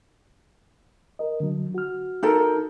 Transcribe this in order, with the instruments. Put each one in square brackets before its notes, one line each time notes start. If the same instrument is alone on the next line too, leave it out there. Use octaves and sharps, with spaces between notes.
[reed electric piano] A#4 D#5
D3 F#3
F#4 F6
[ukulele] D#4 A4 A#4